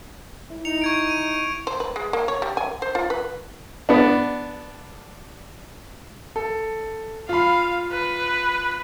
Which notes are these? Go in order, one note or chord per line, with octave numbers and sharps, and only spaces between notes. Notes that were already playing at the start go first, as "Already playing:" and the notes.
E4
D#4 C#7 F7
C#6 G#6 D7
D#7
C5
B4
G#3
A#3
C#5
G3
G#5
C5
F4
B4
B3 D4
A4
F4 F5 B5
B4